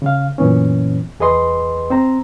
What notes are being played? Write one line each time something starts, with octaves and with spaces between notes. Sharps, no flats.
C#3 F5
F#2 A#2 E3 B3 C#4
E2 G#4 B4 D#5 C6
C4 C5 A#5